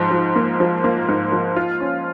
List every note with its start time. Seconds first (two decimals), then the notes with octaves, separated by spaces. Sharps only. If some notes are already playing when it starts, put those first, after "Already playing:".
Already playing: G#2 F3
0.11 F3
0.36 A#3
0.60 F3
0.84 A#3
1.09 G#2
1.32 F3
1.56 F4
1.81 C#4